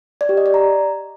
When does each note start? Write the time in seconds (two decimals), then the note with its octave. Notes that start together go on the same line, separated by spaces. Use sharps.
0.21 D5
0.29 G4
0.37 D#5
0.46 D5
0.54 A#5